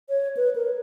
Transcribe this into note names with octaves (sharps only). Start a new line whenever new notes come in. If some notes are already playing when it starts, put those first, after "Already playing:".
C#5
B4
A#4